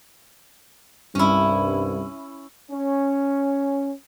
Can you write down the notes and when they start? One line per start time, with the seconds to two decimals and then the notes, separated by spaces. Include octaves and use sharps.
1.15 C2 G2 C#4 E4
2.70 C#4